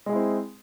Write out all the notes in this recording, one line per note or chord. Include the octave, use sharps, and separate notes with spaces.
G#3 C4 E4 G#4